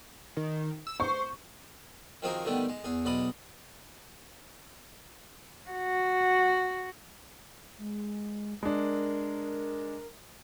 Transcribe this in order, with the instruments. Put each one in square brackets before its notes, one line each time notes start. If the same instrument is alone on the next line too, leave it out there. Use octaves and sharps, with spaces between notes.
[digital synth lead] D#3
E6
[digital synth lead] C5 [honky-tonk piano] C#6
[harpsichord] D#3 F3 C4 F#4 G#4 A#4
D3 D#3 G3 A3 B3
G#3
E2 G#4
B1 G#3 D5 B5 D#6
[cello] F#4
[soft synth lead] G#3
[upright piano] G#3 D4 [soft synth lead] A#4